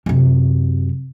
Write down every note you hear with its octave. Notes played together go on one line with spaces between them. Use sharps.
F#2 C3